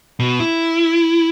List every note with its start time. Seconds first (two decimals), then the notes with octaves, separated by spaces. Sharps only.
0.20 B2
0.40 E4